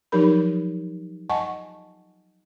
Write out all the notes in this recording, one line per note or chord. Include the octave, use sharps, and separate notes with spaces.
F3 F#3 D#4 G4 A#4 B5
D#5 F#5 G#5 A5 C#6